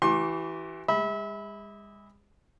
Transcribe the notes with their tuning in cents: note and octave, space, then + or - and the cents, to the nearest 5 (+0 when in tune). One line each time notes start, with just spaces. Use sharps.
E3 +0 G4 -45 C6 +35
G#3 -40 E5 -30 B5 +0